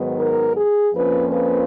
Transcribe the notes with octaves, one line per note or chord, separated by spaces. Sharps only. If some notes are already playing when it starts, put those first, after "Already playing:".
Already playing: G#2 D#3 F#3 B3
A#4
G#4
F2 F3 A#3 C#4 B4
B4